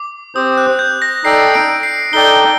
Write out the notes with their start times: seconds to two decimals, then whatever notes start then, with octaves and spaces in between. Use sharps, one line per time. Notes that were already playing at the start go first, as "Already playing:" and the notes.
Already playing: D6
0.35 C4 G4 C5 D#6
0.58 F#6
0.79 G6
1.02 A#6
1.24 D#4 A4 D5 G5 C7
1.54 D7
1.83 C7
2.12 D#4 A4 D5 G5 G7